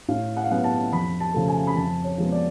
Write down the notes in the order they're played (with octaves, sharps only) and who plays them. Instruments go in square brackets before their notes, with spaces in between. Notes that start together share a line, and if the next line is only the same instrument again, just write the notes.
[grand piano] A2 F5
F#5
F5
F#3 B3 F#5
A5
F2 B5
A5
C#3 F3 A3
G#5
B5
F2 A5
C#5
F3 G#3 B3
D5